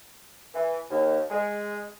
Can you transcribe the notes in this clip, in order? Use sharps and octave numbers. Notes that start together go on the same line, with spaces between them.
E3
D#2
G#3